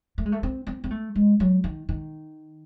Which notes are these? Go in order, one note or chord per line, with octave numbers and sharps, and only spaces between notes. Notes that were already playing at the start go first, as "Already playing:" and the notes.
A3
G#3
A3
C4
C4
C4
A3
G#3
F#3
D#3
D#3